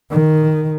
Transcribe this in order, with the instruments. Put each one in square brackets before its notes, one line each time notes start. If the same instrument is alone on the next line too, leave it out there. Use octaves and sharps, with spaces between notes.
[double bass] D#3